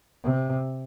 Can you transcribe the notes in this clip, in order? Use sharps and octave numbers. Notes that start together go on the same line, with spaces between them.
C3